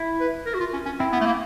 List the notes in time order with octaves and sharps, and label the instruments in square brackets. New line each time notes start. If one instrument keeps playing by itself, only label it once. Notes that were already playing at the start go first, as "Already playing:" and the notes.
Already playing: [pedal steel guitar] E4
[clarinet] B4
A#4
F#4
F4
C#4
C#4
[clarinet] C4 [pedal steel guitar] E4
[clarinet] B3
A3
A#3